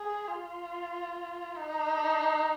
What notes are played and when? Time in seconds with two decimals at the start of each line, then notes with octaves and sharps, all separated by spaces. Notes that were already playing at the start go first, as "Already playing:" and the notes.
Already playing: G#4
0.28 F4
1.56 D#4